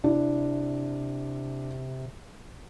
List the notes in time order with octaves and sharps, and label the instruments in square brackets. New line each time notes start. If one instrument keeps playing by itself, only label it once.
[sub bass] C3 [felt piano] D4 E4